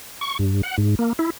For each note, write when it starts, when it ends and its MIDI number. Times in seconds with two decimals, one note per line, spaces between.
0.21 0.38 85
0.39 0.61 43
0.63 0.77 78
0.78 0.95 44
0.99 1.13 58
1.19 1.30 64